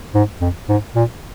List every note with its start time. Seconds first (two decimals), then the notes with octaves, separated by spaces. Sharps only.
0.15 G#2
0.41 F2
0.69 G#2
0.95 A#2